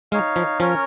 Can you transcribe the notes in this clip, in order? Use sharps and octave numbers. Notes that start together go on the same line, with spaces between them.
G#3 D#4 C#5 F5
F3
F3 C#4 A#4 C#5